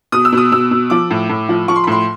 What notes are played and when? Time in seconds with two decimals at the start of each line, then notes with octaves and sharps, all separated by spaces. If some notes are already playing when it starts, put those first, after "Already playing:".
0.12 B2 D#6
0.25 E6
0.32 B2 D#6
0.52 B2 E6
0.71 B2
0.90 F3 D6
1.10 A2
1.29 A2
1.49 F3
1.68 F3 C#6
1.76 C6
1.84 B5
1.87 A2 C6